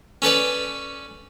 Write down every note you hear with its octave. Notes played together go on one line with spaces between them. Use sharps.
C#4 A4 B4 D5